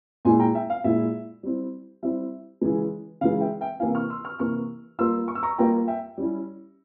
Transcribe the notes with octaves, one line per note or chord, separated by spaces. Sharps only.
A#2 G#3 E4 G#5 C6
G5 A#5
E5 G5
F5
A#2 G#3 E4 E5
G3 C4 E4
G3 C4 E4 E5
C#3 E3 G#3
C#3 E3 G#3 F5
E5 G5
E5 G5
C3 E3 A#3 E4 F5 G#5
C#6 F6
C6 E6
C#6 F6
C3 E3 A#3 E4 C#6 F6
G3 A#3 F4 C6 E6
C#6
E6
A#5 C#6
G3 A#3 F4 G5 A#5
E5 G5
G3 C#4 E4